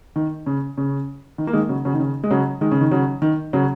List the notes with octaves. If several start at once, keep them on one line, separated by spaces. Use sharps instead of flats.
D#3
C#3
C#3
D#3
A#3
D#3 G#3
C#3 F#3
C#3 F#3
D#3
C#3
G#3
C#3 F#3
D#3 G#3
C#3
D#3
C#3 F#3
D#3
C#3 F#3